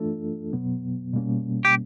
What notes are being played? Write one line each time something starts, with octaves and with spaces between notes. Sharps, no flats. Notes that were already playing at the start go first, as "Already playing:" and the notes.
Already playing: E3 A3 D4 F4 A4
B2 F#3 B3
B2 G3 A#3 C#4
G4